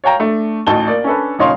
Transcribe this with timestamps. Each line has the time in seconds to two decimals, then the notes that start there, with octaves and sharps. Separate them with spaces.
0.04 C#5 F5 G5 A#5
0.20 A3 D4
0.67 A1 D2 D#4 A5 G7
0.87 A#3 D5
1.04 C#4 D4 A4 B4
1.39 D#1 C#3 D#4 C#5 F5 C6